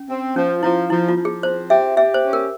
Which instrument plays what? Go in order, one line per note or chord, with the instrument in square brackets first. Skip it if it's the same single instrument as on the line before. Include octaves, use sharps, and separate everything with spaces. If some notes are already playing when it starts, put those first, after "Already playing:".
Already playing: [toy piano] C#4
[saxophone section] C4
[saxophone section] F3 [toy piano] C#4
[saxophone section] F3 [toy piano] E4
[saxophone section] F3 [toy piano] E4
[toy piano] F4
[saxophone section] F3
[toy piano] G#4
[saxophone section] C4 [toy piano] C5
[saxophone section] G4 [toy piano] E5
[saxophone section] G4 [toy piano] E5
[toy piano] C5
[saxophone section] C#4
[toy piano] A#4